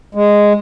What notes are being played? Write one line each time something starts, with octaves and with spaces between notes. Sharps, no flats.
G#3